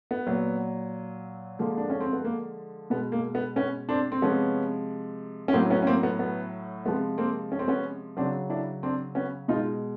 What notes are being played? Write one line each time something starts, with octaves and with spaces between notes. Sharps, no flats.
B3
A#2 F#3
D3 F3 G#3 A#3
D4
C#4
C4
B3
A#3
B2 G#3 B3
A#3
B3
B3 C#4
C4 D4
C4
C3 F3 G#3 B3 C#4
C#4
A2 F#3 A#3 C4
B3 C#4
C#4
A#3 C4
B3
B3
C3 F3 G#3 B3
A#3 C4
C#4
C4
B3 C#4
C#3 F#3 C4 D4
D4 E4
C4 D4
B3 C#4
B2 G#3 D#4 F4